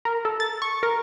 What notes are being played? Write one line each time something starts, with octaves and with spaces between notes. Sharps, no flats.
A#4
A4
A6
C#6
A#4